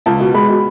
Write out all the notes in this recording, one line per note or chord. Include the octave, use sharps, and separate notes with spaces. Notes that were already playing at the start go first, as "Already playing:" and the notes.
C#2 A5
B2
G#3 B5
B2